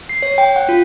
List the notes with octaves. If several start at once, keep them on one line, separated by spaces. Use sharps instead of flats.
C7
C#5
G5
F#5
F4